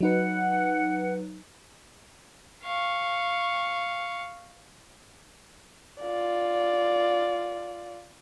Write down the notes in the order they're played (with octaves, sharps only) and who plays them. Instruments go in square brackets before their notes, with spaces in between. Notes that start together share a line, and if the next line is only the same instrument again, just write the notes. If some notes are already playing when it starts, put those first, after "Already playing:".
[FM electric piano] F#3 D#4 B4 [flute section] F#5
[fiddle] F5 C#6
[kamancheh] F4 D5